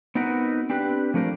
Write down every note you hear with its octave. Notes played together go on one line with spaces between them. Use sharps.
B3 C4 D#4 F#4 A#4 B4
C4 D4 G4 B4
F3 A3 D4 A#4 C5